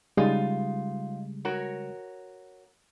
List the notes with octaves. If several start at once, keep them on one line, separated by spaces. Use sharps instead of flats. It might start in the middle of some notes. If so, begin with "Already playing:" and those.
C#3 G3 G#3 D#4 F4
F#4 A#4 C#5